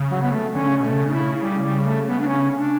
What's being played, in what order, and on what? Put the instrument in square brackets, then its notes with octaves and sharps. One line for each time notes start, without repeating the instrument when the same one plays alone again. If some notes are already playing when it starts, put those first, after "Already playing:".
Already playing: [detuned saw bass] C#3
[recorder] F#3
B3
A3
[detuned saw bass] D3 [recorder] C#4
[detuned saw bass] C#3
[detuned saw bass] B2 [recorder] A3
[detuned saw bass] C#3
[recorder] D4
E4
G3
G3
A3
B3
D4
C#4
D4